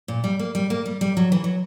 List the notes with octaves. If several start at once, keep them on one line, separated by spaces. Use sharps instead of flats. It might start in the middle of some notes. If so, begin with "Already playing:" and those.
A#2
G3
A#3
G3
A#3
G3
G3
F#3
E3
F#3